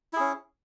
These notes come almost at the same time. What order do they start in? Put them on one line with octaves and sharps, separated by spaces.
E4 G#4 C#4